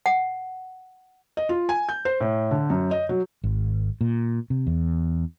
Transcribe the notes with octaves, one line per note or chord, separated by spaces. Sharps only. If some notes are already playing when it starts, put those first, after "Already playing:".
F#5
D#5
F4
G#5
G6
C5
A2
D3
F#2
D#5
F#3
G#1
A#2
C3
E2